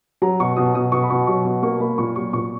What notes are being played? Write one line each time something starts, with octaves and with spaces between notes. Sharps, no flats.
F#3 A#5
B2 C#6
B2 D#6
B2 D#6
B2 C#6
B5
B2 C#6
F#3 C#6
B2
A#3 C#6
A#3 B5
A#2 C#6
F#3 C#6
A#2 C#6